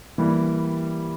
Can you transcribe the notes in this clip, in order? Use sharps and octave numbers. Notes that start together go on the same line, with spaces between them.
E3 G3 A#3